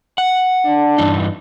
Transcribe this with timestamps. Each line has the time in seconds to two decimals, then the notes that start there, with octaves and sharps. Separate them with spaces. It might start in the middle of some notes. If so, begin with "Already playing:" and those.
0.18 F#5
0.66 D4
0.98 G2 E3 D#4